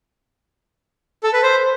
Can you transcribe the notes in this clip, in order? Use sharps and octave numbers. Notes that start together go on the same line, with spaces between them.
A4
B4
C5